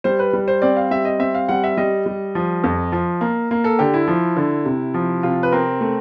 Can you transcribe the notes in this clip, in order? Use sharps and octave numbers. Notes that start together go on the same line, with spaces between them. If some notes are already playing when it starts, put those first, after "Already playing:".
G3 C5
B4
G3
C5
C4 D5
F5
G3 E5
D#5
C4 E5
F5
G3 F#5
E5
G3 D#5
G3
F3
F2
F3
A#3
A#3
A4
D3 G4
E4
F3
D3
C3
F3
C3 F4
B4
C4 A#4
A3